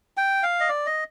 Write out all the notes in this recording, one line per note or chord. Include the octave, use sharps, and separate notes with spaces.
G5
F5
D#5
D5
D#5